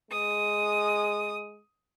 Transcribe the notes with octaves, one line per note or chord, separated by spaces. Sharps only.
G#3 D#6